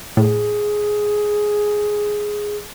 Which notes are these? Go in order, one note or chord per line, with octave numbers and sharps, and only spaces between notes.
A2 G#4